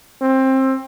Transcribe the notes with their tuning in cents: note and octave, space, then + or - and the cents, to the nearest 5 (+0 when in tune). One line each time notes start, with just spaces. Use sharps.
C4 +20